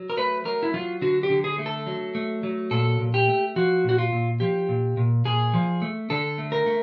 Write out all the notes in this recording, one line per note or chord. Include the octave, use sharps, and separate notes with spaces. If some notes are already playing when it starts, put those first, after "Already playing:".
Already playing: F#3
A#4
A3 B4
F#3 A#4
E4
F#3 F4
D3 F#4
G4
D3
G#4
A3
A4
F#3
A3
F#3
A#2 A4
A#2
G4
A3
F3 F#4
A#2 F#4
F4
A#2
F3 G4
A#2
A#2
A#2 G#4
F3
A3
D3 A4
A3
A#4
A3